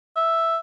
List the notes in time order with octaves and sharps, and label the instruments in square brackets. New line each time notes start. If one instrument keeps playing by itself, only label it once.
[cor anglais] E5